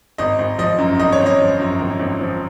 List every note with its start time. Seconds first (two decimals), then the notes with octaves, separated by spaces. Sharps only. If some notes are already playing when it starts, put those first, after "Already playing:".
0.18 G#1 D#5
0.39 G#1
0.58 F3 D#5
0.79 F#2
1.00 G#1 D#5
1.12 C#5
1.20 G#1
1.26 D#5
1.40 F3
1.60 F#2
1.80 G#1
2.00 G#1
2.21 F3